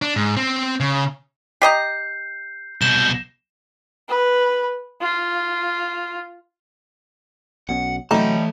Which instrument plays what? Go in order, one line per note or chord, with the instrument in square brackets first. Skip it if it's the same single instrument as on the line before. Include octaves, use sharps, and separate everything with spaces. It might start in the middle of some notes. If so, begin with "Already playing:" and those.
[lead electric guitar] D4
G#2
C4
C#3
[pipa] G4 D#5 A#5 [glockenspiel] G6 C7
[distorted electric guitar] C2 B2 [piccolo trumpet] G6 [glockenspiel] E7
[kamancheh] B4
F4
[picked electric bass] B1 B2 C#4 [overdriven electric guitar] F#5
[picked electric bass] C3 F#3 [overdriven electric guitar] E3 A5 [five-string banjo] G3 D#4 [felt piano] A3